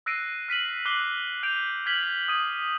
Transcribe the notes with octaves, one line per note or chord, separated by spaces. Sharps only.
E6 F#6 A#6 C7 D7 D#7
F6 B6 D#7 F#7
D6 F#6 C7 F#7 G7
F#6 G6 D7 F7
F6 G#6 B6 F#7 G7
D#6 G#6 D#7